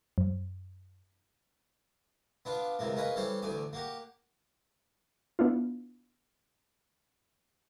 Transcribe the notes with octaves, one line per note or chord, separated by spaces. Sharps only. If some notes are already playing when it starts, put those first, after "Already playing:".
F#2
B3 D4 F4
C#2 C3 E3 A#3
A#3 C#4 D#4 G#4 B4
E3 G3 C#4 A4 C5
A1 D2 D5 G#5
A#3 F#4 G4
B3 D4 E4 F4